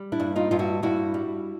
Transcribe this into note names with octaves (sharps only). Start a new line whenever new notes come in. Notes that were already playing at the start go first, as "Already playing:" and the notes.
Already playing: G3
D4 E4
G2
D#4 F4
G2 F4
E4 F#4
G2 E4 F#4
G3